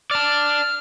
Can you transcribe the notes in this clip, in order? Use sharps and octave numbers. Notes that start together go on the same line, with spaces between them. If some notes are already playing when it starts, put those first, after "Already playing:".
D5 A5 F6